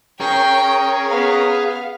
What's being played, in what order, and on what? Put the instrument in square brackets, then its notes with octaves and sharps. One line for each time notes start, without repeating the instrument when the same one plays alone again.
[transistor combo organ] C#4 A#4 [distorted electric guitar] G#4 [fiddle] G5 [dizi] C#6
[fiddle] B3 [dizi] F5